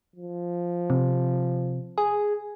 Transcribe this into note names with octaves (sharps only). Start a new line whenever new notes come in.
F3
C3
G#4